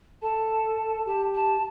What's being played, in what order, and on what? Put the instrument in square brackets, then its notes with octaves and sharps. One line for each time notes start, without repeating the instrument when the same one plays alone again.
[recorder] A4 [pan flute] A5
[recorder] G4 [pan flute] A5
[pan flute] A5